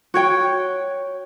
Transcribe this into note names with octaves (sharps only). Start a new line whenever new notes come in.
F#4 C#5 G5